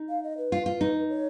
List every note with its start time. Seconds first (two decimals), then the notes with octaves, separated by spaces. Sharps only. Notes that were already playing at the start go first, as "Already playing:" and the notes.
Already playing: D#4
0.09 F5
0.24 D#5
0.38 B4
0.52 F4
0.66 F4
0.81 D#4
1.10 C#5